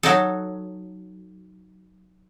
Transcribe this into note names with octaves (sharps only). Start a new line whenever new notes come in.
F#3 D#4 A4